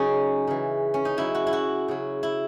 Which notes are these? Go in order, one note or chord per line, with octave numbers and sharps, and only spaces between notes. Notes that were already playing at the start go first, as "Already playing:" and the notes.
Already playing: C#3 F#3 C#4 D#4 F#4 G#4
C#3 E3
C#4
D#4
C#3 F#3 E4
F#4
E4
F#4
C#3 F#3
E4